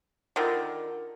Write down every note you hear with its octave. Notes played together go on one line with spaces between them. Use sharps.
D3 D#3 F4 A#4 A#5